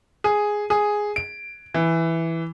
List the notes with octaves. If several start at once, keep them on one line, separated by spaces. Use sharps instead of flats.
G#4
G#4
D7
E3